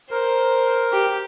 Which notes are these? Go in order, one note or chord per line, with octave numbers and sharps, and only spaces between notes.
A#4 C5
G4